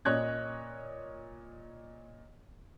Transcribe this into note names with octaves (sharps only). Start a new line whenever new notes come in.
A#2 C#5 D#5 F#6 G#6